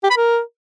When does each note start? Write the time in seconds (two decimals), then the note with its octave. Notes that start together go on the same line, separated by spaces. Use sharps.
0.03 G4
0.10 B5
0.17 A#4